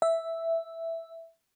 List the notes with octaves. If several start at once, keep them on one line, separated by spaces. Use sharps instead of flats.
E5